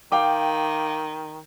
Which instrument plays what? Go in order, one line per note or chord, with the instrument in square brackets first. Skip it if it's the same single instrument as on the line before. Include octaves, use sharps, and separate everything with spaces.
[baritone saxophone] D#3 [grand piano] F5 G5 D6